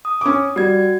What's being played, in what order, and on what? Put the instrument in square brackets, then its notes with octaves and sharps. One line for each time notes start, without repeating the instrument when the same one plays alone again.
[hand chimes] D#6
[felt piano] C#4 D6
[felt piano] G3 [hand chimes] F#4 G#6